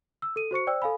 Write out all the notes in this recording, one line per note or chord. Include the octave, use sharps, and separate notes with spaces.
E6
A4 D#7
F#4 C5 C#6 C#7
C5 D5 G5 E6
A4 F5 G#5 B5